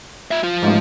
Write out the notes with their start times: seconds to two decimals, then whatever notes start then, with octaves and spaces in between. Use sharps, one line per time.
0.31 F4 E5
0.43 F3 F4
0.62 A1 G#2